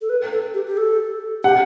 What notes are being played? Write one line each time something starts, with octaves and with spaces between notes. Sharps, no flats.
A4
B4
A4
G4
G4
A4
G4 F#5